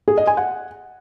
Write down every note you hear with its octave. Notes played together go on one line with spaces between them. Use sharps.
G#4
D#5
G#5
F#5